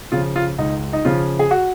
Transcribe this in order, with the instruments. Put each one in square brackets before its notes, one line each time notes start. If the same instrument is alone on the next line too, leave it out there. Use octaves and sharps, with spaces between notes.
[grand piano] C#3 F3 F4
F4
C#2 D#4
D#4
C#3 F3 F4
G#4
F#4